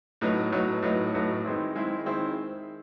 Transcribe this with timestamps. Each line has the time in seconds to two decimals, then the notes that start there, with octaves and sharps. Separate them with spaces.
0.21 A2 F#3 B3 D#4
0.52 A2 F#3 B3 D#4
0.82 A2 F#3 B3 D#4
1.14 A2 F#3 B3 D#4
1.44 D#3 G#3 C4 E4
1.75 D#3 G#3 C4 E4
2.06 D#3 G#3 C4 E4